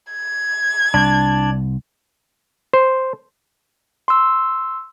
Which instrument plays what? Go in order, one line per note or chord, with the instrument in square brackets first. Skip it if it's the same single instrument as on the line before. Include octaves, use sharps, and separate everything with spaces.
[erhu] G#6
[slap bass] C2 [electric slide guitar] D4
[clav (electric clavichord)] C5
[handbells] C6 E6